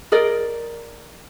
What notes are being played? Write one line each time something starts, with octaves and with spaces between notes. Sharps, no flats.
G#4 A#4 D5 D#5